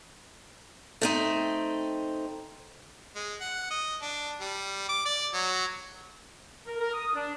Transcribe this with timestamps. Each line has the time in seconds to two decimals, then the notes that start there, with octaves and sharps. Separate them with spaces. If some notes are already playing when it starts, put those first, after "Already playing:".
1.02 A3 C4 D#4
3.15 G#3
3.41 F#5
3.70 D#5
4.01 D4
4.40 G3
4.89 D6
5.06 D5
5.34 F#3
6.67 A#4
6.80 A#4
6.93 D#6
7.15 D4